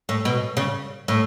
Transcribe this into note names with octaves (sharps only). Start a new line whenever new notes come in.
A2
B2
C#3
A2